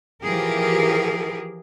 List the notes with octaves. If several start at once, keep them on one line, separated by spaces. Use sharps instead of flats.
E3 F3 G4 G#4 A#4